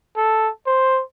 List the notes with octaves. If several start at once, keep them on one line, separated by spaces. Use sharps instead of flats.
A4
C5